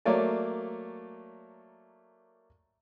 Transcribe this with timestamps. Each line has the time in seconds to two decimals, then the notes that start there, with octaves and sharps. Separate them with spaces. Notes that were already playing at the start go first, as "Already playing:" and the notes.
0.05 F#3 A3 A#3 C#5 D5